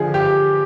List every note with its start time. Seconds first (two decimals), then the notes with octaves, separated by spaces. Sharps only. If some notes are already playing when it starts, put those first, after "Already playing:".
Already playing: D3 F3 G#4
0.14 G4